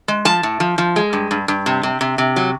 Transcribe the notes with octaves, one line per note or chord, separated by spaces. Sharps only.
G#3
F3 A5
A2
F3
F3
G#3
G2
G2
G2
C3
C3
C3
C3
F#3